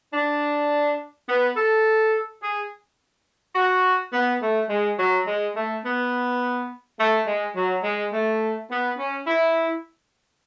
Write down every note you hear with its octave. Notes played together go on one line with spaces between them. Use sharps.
D4
B3
A4
G#4
F#4
B3
A3
G#3
F#3
G#3
A3
B3
A3
G#3
F#3
G#3
A3
B3
C#4
E4